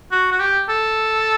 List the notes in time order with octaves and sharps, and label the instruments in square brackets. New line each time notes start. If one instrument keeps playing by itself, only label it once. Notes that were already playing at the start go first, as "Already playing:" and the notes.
[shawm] F#4
F#4
G4
A4